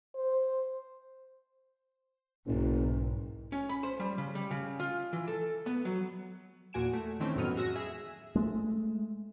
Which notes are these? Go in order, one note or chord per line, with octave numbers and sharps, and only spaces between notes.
C5
F#1 B1 G#2
C#4
B5
C5
G3
C#3
G3
C#3
F4
E3
A4
B3
F#3
E2 A#2 F#4 G#5 D7 E7
A3
D#3 E3 A3 C4 C#4
F2 A2 F#3 B3 F6 D#7
G#3 F#4 E6 A#6
G#4 E5
G#3 A3